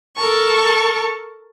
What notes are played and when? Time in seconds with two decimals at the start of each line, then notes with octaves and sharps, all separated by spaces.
0.15 A4 A#4 A5 C#6